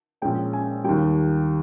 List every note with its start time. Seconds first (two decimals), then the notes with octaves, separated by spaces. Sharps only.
0.22 A#1 A#2 G#3 C#4 G5
0.53 G#5
0.84 D#2 D#3 G3 G5